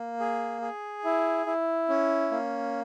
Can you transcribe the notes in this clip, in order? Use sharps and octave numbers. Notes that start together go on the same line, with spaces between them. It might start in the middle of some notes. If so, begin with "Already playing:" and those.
Already playing: A#3
G#4
G#4
E4
E4
C#4
A#3